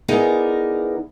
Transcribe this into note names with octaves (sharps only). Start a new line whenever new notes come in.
E3 B3 D#4 G#4 A#4 D5